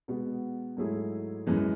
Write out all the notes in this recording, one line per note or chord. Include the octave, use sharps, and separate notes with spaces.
B2 G#3 B3 F#4
G#2 F#3 A3 E4 G#4
F#2 E3 G#3